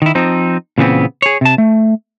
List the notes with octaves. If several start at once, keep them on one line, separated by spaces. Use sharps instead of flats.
D#3 E4
F3 C4 D#4
A#2 C#3 E3 A3 B3 C4
G#4 C#5
C3 A5
A3